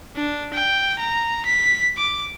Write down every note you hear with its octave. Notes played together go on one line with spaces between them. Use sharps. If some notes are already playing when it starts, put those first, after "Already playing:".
D4
G5
A#5
B6
D6